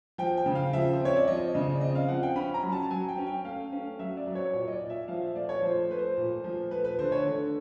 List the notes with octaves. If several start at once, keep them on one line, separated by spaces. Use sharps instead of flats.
F3 G5
G5
C#3
F5
F3 E5
C5
C4
C#5
D5
F3 D#5
C#3 D#5
D5
C4 D#5
F5
F3 F#5
G5
C#4 B5
A#5
F#3
A5
F#3 G#5
G5
C#4
G5
A3 F5
C#4
F#3 E5
D5
F#3
C#5
A#2 C#5
D#5
D5
A#2
E5
F3 F5
E5
A3 D5
C#5
F3 C5
C5
A3 B4
C5
A#2
F3
A3 B4
B4
D3 C5
C#5
D3